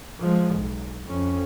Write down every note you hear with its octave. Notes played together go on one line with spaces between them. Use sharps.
F3 G#3
B1
F2 C#4